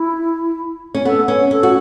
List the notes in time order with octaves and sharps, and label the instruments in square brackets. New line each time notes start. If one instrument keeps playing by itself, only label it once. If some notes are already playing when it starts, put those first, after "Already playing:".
Already playing: [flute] E4
[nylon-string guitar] C#4
[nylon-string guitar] B3 [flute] A4
[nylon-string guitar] C#4 [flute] B4
[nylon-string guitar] C#4 [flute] A4
[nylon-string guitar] F#4